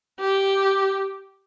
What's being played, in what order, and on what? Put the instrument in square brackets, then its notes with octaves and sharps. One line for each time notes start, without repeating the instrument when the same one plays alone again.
[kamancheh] G4